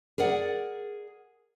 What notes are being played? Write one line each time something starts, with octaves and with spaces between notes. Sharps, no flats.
G#4 A#4 D5 F#5